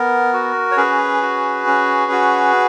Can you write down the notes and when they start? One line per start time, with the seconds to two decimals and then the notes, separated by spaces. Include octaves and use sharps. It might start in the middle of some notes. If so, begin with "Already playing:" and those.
Already playing: B3 A#4
0.33 F#4
0.71 C#5
0.77 C#4 G#4 B4
1.22 F#4
1.67 C#4
2.12 F#4